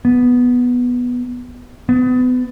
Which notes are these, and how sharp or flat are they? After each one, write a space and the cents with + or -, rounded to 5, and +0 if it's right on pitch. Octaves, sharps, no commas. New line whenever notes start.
B3 -5
B3 +30